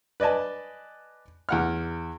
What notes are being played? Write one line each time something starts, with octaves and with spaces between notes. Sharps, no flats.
B4 D5 D#5 G#5 A5
E2 F#5 F6